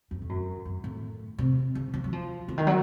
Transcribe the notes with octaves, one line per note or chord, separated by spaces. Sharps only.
F2
A2
F#2
F#2
A2
C3
C#3
F3
F#3
F3
C#3
D#3
F#3